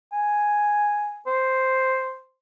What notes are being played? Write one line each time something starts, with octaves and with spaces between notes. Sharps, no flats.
G#5
C5